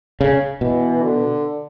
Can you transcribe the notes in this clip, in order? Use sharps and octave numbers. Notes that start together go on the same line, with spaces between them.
C#3
B2 E3
D3